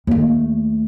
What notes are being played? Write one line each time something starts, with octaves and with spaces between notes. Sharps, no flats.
D#2 A3